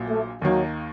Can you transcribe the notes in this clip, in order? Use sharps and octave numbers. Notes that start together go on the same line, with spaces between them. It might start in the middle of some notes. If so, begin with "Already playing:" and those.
Already playing: A#1 A#2 F#3
A3
D#2 D#3 F#3 A#3 D#4